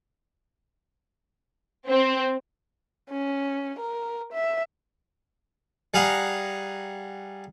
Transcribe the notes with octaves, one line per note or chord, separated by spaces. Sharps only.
C4
C#4
A#4
E5
G3 G#4 F5 F#5 A#5